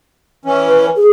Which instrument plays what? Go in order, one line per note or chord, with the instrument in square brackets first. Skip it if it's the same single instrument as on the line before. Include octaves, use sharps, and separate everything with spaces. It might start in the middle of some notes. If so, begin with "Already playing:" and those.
[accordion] E3 C#4
[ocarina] B4
G#4